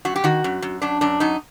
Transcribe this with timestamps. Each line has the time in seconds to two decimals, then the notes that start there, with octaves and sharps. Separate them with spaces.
0.05 F#2 F#4
0.16 G4
0.24 D#3 F#4
0.44 F#2
0.62 F#2
0.82 F#2 D4
1.01 F#2 D4
1.20 F#2 D#4